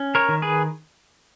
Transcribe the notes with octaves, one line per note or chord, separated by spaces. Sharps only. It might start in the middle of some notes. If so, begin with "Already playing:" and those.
Already playing: C#4
A#4 C#5
D#3
G#4 B4